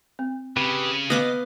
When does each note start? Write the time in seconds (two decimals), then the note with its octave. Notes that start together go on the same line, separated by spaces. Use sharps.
0.19 C4
0.57 C#3 C4 G4 B4
1.10 B3 D#5 F5 D6